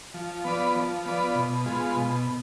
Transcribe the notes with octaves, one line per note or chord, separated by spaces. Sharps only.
F3
B3 F4 B4 D5
F3
B3 F4 B4 D5
B2
G#3 B3 F4
B2